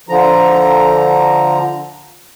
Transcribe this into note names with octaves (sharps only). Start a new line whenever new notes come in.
D3 F3 A#5